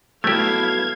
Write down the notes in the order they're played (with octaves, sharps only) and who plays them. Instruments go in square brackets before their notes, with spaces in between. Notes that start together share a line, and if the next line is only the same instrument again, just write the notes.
[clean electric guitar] F#3 B3 A4 [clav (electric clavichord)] A3 G4 [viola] E4 F5 [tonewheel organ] G#6